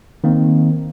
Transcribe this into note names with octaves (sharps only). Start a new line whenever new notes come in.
D#3 A#3 C4